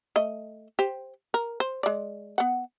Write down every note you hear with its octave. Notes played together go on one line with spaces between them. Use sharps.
A3 D#5
G4 C5
A#4
C5
G#3 D5
B3 F#5